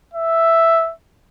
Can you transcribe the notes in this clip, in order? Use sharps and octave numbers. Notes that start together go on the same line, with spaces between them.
E5